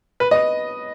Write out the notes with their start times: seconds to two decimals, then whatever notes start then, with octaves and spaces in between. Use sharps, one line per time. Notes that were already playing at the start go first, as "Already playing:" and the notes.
0.20 B4
0.31 D#5